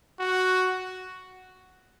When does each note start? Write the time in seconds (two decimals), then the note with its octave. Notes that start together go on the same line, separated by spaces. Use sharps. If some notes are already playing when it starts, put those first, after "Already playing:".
0.19 F#4